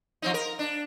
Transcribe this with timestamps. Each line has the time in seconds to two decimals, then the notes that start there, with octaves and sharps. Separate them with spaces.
0.22 F3 C4 D#4
0.34 A#4
0.59 D4